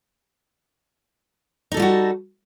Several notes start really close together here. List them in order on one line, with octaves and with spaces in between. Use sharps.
D#4 A4 G3 F4 F#4